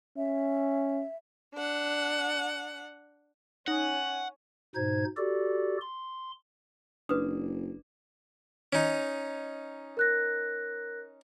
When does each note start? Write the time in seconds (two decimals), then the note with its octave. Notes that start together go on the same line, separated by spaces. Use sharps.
0.17 C#4 E5
1.55 D4 F#5
3.68 C#4 D#4 F#5
4.75 G#2 B2 D#4 C5 G#6
5.17 F#4 G4 A4 D5
5.81 C6
7.09 F#1 D4 F#4 B4 D#6
8.73 C#4 D#4
9.97 A#4 F#6 A#6